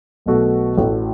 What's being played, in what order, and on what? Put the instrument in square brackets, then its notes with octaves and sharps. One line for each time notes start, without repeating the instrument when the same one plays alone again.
[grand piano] B1 B2 A3 F#4
A1 A2 A3 F#4